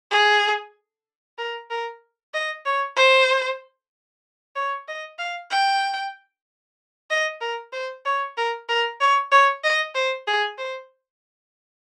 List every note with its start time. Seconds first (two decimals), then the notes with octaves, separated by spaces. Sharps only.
0.11 G#4
1.38 A#4
1.71 A#4
2.34 D#5
2.66 C#5
2.97 C5
4.56 C#5
4.88 D#5
5.19 F5
5.51 G5
7.10 D#5
7.41 A#4
7.73 C5
8.05 C#5
8.37 A#4
8.69 A#4
9.01 C#5
9.32 C#5
9.64 D#5
9.95 C5
10.27 G#4
10.58 C5